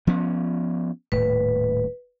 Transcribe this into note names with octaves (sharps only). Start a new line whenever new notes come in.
F3 B3 C#4
D#1 A2 B4